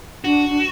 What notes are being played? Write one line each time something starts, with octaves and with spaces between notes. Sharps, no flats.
D4 F#4
D4